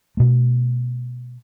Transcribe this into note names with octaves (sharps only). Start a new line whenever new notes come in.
B2 A3